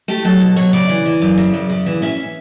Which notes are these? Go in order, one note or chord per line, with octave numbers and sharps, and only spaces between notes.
A3 G4
F#3 A4
B2
F#3 C#5
C#3 D5
E3
E3
F#2
C#3
F#2
C#3
E3
C#4 E5